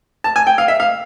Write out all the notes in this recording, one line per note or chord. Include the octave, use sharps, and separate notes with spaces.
A5
G#5
G5
F5
E5
F5